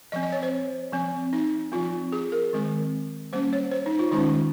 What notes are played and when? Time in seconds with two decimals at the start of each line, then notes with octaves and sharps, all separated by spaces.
0.12 F3 C4 D#5
0.23 D#5
0.32 C#5
0.43 C5
0.92 F3 C4
1.33 D#4
1.72 F3 C4 F4
2.12 G#4
2.32 A#4
2.53 D#3 G#3 C4
3.33 G3 A#3 C#4 C5
3.53 C#5
3.71 C5
3.86 D#4
3.99 F4
4.12 D#3 G#3 C#4 D#4